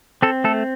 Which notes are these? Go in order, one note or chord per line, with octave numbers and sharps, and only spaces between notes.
C4 A4
A3 A4